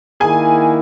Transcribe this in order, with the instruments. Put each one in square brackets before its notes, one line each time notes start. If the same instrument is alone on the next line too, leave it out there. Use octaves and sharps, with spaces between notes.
[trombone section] D#3 A#3 E4 [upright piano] G#4 G#5